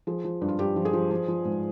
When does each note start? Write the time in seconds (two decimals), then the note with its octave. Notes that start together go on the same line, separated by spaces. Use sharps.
0.07 F3 G#4
0.24 F3
0.41 G2
0.48 F4
0.59 G2 G4
0.76 F3
0.85 G#4
0.93 F3
1.11 F3
1.28 F3
1.45 G#2